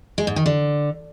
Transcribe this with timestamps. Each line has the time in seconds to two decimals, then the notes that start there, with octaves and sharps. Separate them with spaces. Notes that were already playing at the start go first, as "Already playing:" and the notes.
0.18 G#3
0.27 G#2
0.36 D#3
0.46 D3